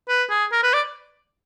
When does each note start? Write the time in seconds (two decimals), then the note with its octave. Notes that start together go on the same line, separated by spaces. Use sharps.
0.09 B4
0.30 G#4
0.52 A#4
0.63 B4
0.74 D5